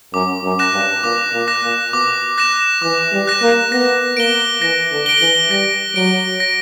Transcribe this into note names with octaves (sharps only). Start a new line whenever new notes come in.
F#2 D6
F#2
F#6 A#6 E7
G2
A#2 D6
A#2
F#6 A#6 E7
A#2
B2 D6
F#6 A#6 E7
E3 D6
G3
F#6 A#6 E7
A#3
B3 A#6
A#3 D7 G7
E3 A#6
D3
D7 G7
E3
G3 A#6
F#3 D7 G7
A#6